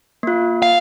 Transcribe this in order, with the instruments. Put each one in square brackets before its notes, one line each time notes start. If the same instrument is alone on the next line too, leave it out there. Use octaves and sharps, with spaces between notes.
[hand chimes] A#3 F4
[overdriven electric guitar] F5